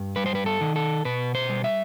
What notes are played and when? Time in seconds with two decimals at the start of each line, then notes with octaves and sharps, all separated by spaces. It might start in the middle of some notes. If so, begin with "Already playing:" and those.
Already playing: G2
0.16 G3 B4
0.26 C5
0.35 B4
0.46 A4
0.61 D#3
0.76 A4
1.05 B2 B4
1.35 C5
1.49 G3
1.64 E5